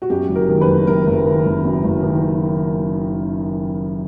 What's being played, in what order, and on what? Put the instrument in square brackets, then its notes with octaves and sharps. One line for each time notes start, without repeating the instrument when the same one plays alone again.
[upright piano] F#4
F#2 G4
F#1
A#4
D#3
B4
F#1
F#2 A#4
F#1
D#3
F#1
F#2
F#1
D#3